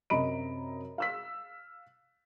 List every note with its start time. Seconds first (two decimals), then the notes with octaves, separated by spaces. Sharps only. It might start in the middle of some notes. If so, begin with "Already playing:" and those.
0.10 F#2 C3 D#5 A#5 B5 D7
0.98 F5 E6 B6